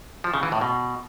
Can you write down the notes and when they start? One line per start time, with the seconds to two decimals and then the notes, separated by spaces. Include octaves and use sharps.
0.24 F3
0.34 C#3
0.43 E3
0.52 A2
0.61 B2